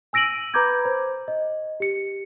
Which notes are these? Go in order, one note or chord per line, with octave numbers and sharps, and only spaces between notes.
G#5 E6 A#6 D7 D#7 F#7
B4 A#5 B5 D6 G6 G#6
C5
D#5
G4 C#7